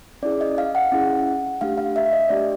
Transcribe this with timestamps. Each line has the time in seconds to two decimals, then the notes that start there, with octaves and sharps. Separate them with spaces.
0.23 C#4 E4 G#4 D5
0.41 D#5
0.58 F5
0.75 F#5
0.92 C#4 E4 G#4
1.61 A3 D4 G4 F5
1.78 F5
1.96 E5
2.13 D#5
2.29 A3 D4 G4 D5